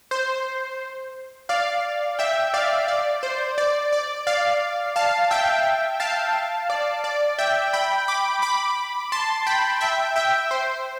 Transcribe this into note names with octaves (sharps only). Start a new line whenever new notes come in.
C5
D5 F5
E5 G5
D5 F5
D5
C5
D5
D5
D5 F5
F5 A5
E5 G5
F5 A5
D5
D5
E5 G5
G5 B5
B5 D6
B5 D6
A5 C6
G5 B5
E5 G5
E5 G5
C5